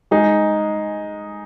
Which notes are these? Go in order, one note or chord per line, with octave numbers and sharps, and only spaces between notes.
G#3 D#4 G#4